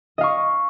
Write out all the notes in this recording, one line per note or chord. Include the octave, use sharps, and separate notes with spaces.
D#5 F5 C#6